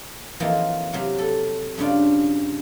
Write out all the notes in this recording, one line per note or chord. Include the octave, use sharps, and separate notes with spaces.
F2 E3 F#3 A#3 D#4 F4
C3 F#3 F5
A4
G2 C#3 D4 F4